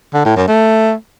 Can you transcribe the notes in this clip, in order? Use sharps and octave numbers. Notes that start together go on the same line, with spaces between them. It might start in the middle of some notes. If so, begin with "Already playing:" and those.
D3
A2
F#2
A3